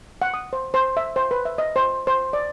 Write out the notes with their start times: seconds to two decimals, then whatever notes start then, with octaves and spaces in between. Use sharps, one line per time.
0.22 F#5
0.34 D#6
0.53 C5
0.74 C5
0.97 E5
1.16 C5
1.31 B4
1.45 E5
1.58 D#5
1.76 C5
2.07 C5
2.33 D5